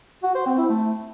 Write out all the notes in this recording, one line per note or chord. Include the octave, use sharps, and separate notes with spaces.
F#4
C5
C4
E4
A3